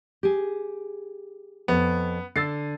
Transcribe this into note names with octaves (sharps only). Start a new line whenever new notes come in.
G4 G#4
F2 B3
D3 E6 A6 C7